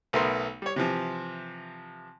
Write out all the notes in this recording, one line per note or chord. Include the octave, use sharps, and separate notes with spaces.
B1 A3 B3 A#4 C6
G3 C#5
C3 E3 F3